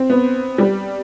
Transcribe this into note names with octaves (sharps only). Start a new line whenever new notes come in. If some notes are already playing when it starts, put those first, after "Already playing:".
Already playing: C4
B3
G3